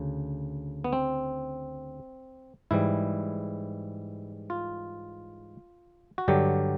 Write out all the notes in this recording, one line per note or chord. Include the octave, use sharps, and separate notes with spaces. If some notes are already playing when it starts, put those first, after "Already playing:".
Already playing: D2 C#3
B3
C4
G#2 E3 G3 E4
F4
F#4
G2 D3 F#3 G4